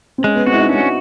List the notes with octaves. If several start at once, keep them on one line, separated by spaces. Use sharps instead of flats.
C4
G#3 C#4
B3
C4 F#4
E4
D#4
C#4 D4